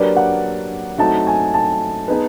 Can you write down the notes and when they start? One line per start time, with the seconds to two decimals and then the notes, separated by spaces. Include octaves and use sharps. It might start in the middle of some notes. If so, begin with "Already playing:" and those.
Already playing: F#3 A#3 D4 G4 B4 D5
0.16 F#5
0.98 F#3 A3 C4 D#4 F#4 A5
1.27 G#5
1.54 A5
2.08 B3 D#4 G#4 B4